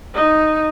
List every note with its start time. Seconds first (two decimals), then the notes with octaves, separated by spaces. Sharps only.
0.15 D#4